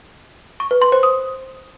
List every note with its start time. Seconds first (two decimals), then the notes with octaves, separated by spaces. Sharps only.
0.60 C#6
0.71 B4
0.82 C6
0.92 C5
1.03 D#6